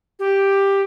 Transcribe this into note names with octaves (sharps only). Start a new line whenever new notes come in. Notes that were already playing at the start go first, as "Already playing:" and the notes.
G4